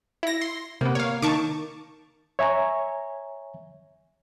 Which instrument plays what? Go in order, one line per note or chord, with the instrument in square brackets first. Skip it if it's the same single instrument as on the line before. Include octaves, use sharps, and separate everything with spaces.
[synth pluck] E4 A#6
C6
[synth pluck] C3 B3 [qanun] A#3
[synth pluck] C#5 F5
[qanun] D#3 [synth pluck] A5 C#6 D6
[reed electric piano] C#5 E5 G#5 A#5